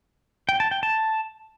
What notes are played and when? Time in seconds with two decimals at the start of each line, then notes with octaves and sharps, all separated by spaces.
0.49 G5
0.60 A5
0.71 G5
0.83 A5